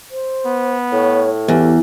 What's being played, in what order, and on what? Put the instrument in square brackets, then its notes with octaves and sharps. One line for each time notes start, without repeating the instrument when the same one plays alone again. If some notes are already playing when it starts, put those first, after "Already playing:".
[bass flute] C5
[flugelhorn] B3
[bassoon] A2 [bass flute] C#5
[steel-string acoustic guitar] E2 [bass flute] G4